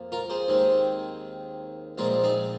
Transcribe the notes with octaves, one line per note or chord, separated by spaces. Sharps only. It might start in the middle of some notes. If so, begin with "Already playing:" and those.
Already playing: F2 F3 A#3
F4 A#4
G#4 C5
D#2 D#3 G#3 C4
A#1 A#2 G#3 C4 F4 A#4
D#4 G#4